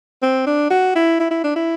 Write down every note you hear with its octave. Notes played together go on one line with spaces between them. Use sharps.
C4
D4
F#4
E4
E4
E4
D4
E4